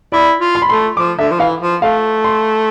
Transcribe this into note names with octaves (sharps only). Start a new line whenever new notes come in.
E4 D5
F4
C6
B5
A3 C6
F3 D6
D3 E5
F3
E3 F5
F3
A3 F5
C6